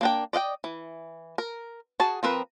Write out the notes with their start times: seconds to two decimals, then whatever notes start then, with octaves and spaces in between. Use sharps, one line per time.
0.01 A#3 D4 G5
0.33 D5 D#5 F5 G5
0.64 E3
1.38 A#4
2.00 F#4 G#4 A5
2.23 F3 C4 A#4 B4